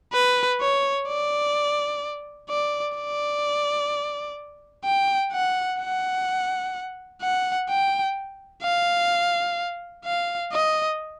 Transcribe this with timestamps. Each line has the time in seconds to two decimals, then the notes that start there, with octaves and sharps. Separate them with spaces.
0.13 B4
0.60 C#5
1.08 D5
2.50 D5
2.97 D5
4.85 G5
5.33 F#5
5.80 F#5
7.22 F#5
7.69 G5
8.63 F5
10.05 F5
10.52 D#5